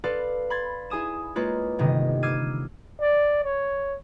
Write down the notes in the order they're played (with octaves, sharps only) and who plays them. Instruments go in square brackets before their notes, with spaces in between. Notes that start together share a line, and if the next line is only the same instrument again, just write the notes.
[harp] A4 B4 D5 F5 C6
B5 C6 G#6 A6
E4 G#4 G#5 D#6 E7
G#3 A#3 F4 B4 C#5
G1 C3 D#3 D#5
D6 E6 F6 G#6 C7 D#7
[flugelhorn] D5
C#5